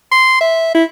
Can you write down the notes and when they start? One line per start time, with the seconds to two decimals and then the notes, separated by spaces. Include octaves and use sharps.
0.12 C6
0.41 E5
0.75 E4